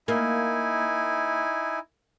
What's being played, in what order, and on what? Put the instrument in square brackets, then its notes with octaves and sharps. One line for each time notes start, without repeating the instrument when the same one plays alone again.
[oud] A#3 [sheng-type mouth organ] D#4 E4 G#5